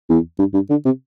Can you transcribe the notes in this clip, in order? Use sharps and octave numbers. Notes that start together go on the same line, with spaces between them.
E2
G2
G2
D3
C3